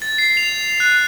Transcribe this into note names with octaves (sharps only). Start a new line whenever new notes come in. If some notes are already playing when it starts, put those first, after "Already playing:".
A6
C7
F7
F#6